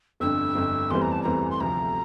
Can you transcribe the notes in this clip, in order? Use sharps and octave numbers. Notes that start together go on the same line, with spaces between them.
G1 F2 D3 E6
G1 F2 D3
F1 E2 E3 G3 C4 C6
A#5
A5
F1 E2 E3 G3 C4 A#5
C6
D2 C3 F3 A#5